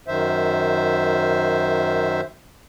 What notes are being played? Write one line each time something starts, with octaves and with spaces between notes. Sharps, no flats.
F#2 D#3 C5 E5